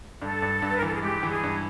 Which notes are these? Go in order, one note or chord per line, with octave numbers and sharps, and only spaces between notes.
G2 A4
G2
G2
B4
A#4
E3 A4
G#4
G#3 G4
E3
G#4
G2